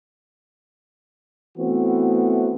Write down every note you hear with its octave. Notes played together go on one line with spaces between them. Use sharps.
E3 A3 B3 C4 F#4